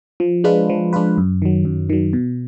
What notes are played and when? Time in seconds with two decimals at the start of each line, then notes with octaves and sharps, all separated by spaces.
0.20 F3
0.44 G#3 D4 F4 B4
0.69 F3
0.93 G#3 D4 F4 B4
1.18 F#2
1.42 D#3 F#3
1.65 F#2
1.90 D#3 F#3
2.13 B2